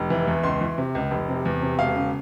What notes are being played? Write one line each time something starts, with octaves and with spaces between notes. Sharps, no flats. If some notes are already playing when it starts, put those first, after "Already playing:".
Already playing: F1
E3
E2
C#2 C6
E3
C3
C#2
F1
C3
E2
C3
E1 F5
C#3